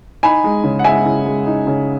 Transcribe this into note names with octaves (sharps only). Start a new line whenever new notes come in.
D#4 G#5 B5
G#3
C#3
F#5
G#3 E5 G#5
C#3
G#3
D#4
C#3